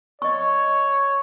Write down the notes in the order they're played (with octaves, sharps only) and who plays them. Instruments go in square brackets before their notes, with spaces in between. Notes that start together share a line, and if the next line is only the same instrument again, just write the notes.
[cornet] C#5 [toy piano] D#5 C#6